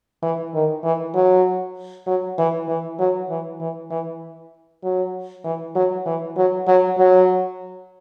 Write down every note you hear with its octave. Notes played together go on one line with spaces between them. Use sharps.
E3
D#3
E3
F#3
F#3
E3
E3
F#3
E3
E3
E3
F#3
E3
F#3
E3
F#3
F#3
F#3